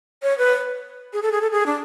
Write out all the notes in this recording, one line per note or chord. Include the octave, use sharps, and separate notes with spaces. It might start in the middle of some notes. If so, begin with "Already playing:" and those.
C#5
B4
G#4
A4
G#4
A4
G#4
D4